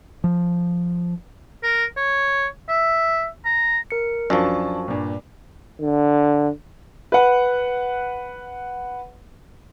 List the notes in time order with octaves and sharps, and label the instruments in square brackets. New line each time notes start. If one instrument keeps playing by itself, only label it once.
[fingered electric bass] F3
[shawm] A#4
C#5
E5
A#5
[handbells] A#4 C#7
[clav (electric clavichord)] F#2 F3 [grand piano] D4 A5 [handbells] G#5 C#6
[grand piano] G2 A#2
[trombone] D3
[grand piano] B4 F#5